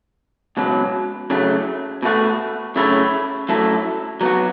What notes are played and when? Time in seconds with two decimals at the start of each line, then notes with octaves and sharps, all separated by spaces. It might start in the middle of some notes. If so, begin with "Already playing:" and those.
0.57 C#2 B2 F#3
1.30 F#2 C#3 F#3 A3
2.03 B2 A3 F#4
2.76 F#2 C#3 A3 E4 C#5
3.49 F#2 F#3 A3 E4 A4
4.21 F#3 B3 F#4